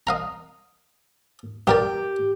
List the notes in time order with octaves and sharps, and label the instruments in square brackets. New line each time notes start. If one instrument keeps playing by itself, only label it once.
[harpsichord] D#5 F5 A#5
[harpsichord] G2 A#4 D5 [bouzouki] G4